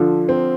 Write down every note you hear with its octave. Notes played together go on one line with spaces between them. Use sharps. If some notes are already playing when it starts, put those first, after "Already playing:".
Already playing: D3 F3 D4 F4 A4
C4